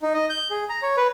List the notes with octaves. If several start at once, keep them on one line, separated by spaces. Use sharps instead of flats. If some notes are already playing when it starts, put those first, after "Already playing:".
D#4
D#5
G6
G#4
A#5
C#5
B4